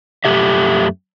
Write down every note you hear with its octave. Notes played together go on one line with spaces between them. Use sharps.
F#2 A3 G4 E5